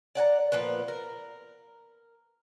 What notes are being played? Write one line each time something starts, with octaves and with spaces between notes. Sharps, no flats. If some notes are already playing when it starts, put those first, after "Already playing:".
D5 F#5 G#5 A#5
A#2 F3 B3 B4
A#4